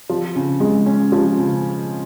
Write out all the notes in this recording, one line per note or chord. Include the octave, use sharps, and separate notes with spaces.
F3
C#3
G#3
C#4
F3
C#3